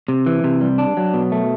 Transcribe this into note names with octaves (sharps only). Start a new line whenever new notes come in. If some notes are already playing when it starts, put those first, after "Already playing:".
C3
E3
C3
G3
D4
F#3
B2
A3